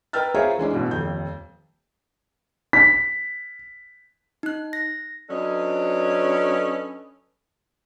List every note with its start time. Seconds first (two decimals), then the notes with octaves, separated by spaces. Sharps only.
0.13 A#4 B4 G5 E6 F6 A6
0.34 F4 G#4 A#4 C5 C#5 E5
0.58 E3 G#3 C#4 D4
0.73 A1 B2
0.91 D#1 F2 G6
2.73 B6
4.43 D#4 F#6
4.73 A#6
5.30 F#3 C#4 D4 A4 B4 D#5